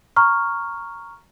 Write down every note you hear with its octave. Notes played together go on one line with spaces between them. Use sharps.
A#5 C#6 F6